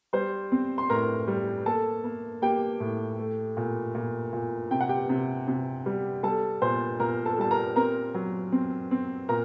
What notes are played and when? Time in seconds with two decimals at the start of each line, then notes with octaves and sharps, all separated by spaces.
0.13 G3 C5 C6
0.52 C4
0.78 C6
0.90 A2 A#4 A#5
1.28 G3
1.66 A#3 A4 A5
2.04 A#3
2.42 A#3 G4 G5
2.80 A2
3.19 A3
3.57 A#2
3.95 A#2
4.33 A#2
4.71 C3 G5
4.81 F#5
4.89 G4 G5
5.09 C3
5.48 C3
5.86 G3
6.23 G3 A4 A5
6.62 A#2 C5 C6
7.00 A#2 A#4 A#5
7.25 A4 A5
7.38 G3 A5
7.51 A#4 A#5
7.76 C4 A#4 A#5
8.14 F#3
8.52 C4
8.91 C4
9.29 A#2 A#4 A#5